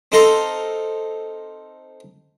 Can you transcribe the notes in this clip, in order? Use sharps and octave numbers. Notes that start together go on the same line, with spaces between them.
C4 D#4 A4 F5 A#5 C6